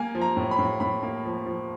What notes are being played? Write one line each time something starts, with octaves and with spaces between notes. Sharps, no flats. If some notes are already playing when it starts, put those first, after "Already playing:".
Already playing: A#3 G#5
F3
A#5
A2
B5
A2
A2 B5
A#3
F3
F3